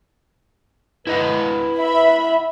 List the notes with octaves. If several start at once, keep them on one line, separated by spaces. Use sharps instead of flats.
E4 B4 D#5 F#5
E5 B5